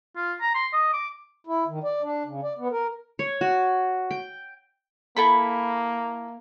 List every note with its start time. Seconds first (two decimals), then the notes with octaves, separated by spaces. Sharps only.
0.17 F4
0.41 A#5
0.55 C6
0.73 D#5
0.93 D6
1.47 E4
1.68 D#3
1.84 D5
2.02 D4
2.26 C#3
2.43 D5
2.58 B3
2.71 A#4
3.19 C#5
3.41 F#4
4.11 G5
5.16 A#3 E4 A4 B5